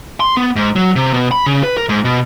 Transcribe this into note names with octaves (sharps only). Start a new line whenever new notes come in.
C6
B3
G#2
F#3
C3
B2
B5
C#3
B4
A#4
G#2
B2